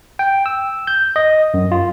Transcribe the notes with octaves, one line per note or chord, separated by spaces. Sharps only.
G5
E6
G6
D#5
F#2
F4